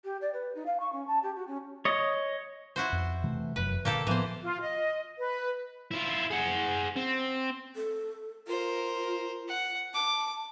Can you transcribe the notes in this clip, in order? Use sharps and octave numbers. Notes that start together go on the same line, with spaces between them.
G4
D5
B4
D#4
F5
C#6
C#4
A5
G4
F#4
C#4
C#5 D#5
E4 F#4 C5
F2
C3 E3 A3
F1 F#2 B4
A#2 D3 A#3 G4 A4
A2 E3 F3 B3 C5
F4
D#5
B4
E4 F4
G#4 F#5
C4
A4
F4 A#4 C5
F#5
A5 D6